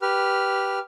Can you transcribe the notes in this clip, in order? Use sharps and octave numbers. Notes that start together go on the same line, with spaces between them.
G4 B4 F6